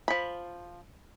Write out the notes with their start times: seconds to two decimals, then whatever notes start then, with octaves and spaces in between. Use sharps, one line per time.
0.08 F3 B5